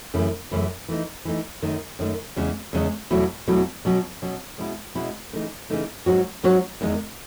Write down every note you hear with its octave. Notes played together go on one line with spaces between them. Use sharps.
F#2 C#3 E3 A3 E4
F#2 C#3 E3 A3 E4
E3 A3 D#4
E3 A3 D#4
F#2 D#3 A3
F#2 D#3 A3
E2 C#3 G#3
E2 C#3 G#3
E2 B2 F#3 A3 E4
E2 B2 F#3 A3 E4
B2 F#3 C#4
B2 F#3 C#4
B2 G#3 C#4 E4
B2 G#3 C#4 E4
C#3 E3 A3 D#4
C#3 E3 A3 D#4
G#2 F#3 C#4 F#4 C#5
G#2 F#3 C#4 F#4 C#5
E2 D#3 G#3